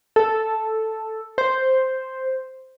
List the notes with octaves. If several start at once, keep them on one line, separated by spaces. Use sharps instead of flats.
A4
C5